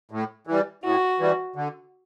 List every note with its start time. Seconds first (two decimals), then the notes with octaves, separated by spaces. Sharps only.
0.11 A2
0.47 E3 G3
0.83 A2 F#4
1.19 E3 G3
1.56 D3